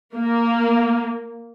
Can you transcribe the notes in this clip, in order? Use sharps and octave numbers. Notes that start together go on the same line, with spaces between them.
A#3